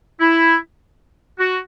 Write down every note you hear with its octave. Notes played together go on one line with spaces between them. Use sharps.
E4
F#4